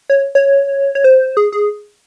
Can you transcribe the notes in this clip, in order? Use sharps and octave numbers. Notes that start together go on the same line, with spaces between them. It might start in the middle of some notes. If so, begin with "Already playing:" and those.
C#5
C#5
C#5
C5
G#4
G#4